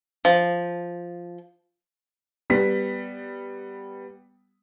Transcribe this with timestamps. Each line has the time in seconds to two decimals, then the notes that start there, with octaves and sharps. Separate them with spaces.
0.25 F3
2.50 G3 B3 B6